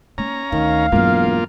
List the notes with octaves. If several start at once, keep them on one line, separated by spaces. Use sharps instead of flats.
A#3 C#4 D#4 A#5
D2 D#3 F5
E1 G2 F#3 A#3 F4